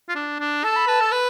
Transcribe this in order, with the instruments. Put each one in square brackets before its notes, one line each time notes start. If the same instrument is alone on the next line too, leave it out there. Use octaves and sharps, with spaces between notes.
[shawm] F4
D4
D4
[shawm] A4 [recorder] A5
[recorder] B5
[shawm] B4 [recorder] A5
[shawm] A4
B4